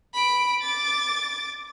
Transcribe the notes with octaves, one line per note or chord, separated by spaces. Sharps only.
B5 D7
D6 A6